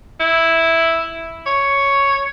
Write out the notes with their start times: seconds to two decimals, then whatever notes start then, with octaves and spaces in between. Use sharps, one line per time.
0.20 E4
1.46 C#5